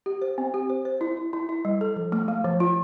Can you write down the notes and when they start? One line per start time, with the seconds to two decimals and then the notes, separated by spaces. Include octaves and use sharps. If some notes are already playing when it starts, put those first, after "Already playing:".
0.06 G4
0.22 C5
0.38 C4
0.54 G4
0.70 C5
0.85 C5
1.01 E4
1.17 E4
1.33 E4
1.49 E4
1.65 G3
1.81 A4
1.96 F3
2.12 A3
2.28 A3
2.44 F3
2.60 F4